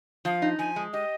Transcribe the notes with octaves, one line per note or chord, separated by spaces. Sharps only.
F3 F5
D#4
F3 G#5
G#3
G4 D#5